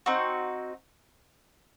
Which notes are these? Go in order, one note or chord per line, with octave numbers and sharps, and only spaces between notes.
C4 D#4 F#4